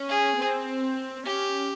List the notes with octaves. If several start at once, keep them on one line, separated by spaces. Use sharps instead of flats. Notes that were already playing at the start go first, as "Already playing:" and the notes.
Already playing: C#4
G#4
C4
C#4 G4